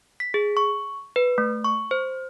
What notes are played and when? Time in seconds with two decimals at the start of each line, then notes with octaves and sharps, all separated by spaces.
0.20 B6
0.34 G#4
0.57 C#6
1.16 B4
1.38 A3
1.64 C#6
1.91 C5